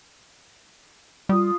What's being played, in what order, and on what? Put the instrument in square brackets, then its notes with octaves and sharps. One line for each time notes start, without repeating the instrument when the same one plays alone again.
[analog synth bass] G3 [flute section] F4 D#6